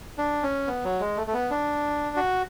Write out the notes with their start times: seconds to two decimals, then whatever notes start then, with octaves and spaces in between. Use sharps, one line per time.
0.18 D4
0.43 C#4
0.67 B3
0.84 F#3
1.01 G#3
1.17 A3
1.27 A3
1.33 B3
1.50 D4
2.16 F#4